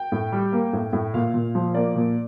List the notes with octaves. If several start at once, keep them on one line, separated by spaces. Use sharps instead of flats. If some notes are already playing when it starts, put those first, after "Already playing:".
Already playing: G5
A2
G3
A#3
A2
A2
A#2 F5
A#2
F3
A#3 D5
A#2